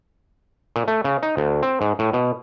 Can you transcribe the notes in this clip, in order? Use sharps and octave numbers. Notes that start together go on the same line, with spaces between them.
A#2
A3
C#3
D#4
D2
C4
G#2
A2
B2